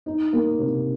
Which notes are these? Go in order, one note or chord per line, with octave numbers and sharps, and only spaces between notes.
D#4
A#3
C3